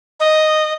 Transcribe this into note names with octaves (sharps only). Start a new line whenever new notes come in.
D#5